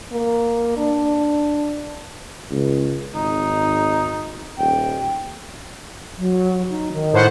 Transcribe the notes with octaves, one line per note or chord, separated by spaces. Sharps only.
A#3
D4
C#2
G#1 D#4
D#1 G5
F#3
D#4
D#3
A2 C5 F#5